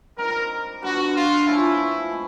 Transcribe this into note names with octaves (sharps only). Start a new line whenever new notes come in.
G3 C4 D#4 G4 A#4
D3 G3 B3 D4 F#4
F4
F3 A3 C#4 E4
G#3 C4